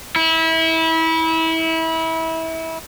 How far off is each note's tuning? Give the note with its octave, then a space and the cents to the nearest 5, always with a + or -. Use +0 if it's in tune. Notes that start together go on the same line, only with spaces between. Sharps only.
E4 -25